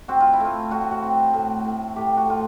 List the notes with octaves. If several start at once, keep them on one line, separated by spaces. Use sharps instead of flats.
C4 F#4
F4
E4
A3 F4
A2 F#4
F4
F#4
C4
A2
A2
A2 G4
F#4
A2 F4